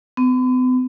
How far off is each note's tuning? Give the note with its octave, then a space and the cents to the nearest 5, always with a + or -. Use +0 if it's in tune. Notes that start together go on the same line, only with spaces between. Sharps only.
B3 +45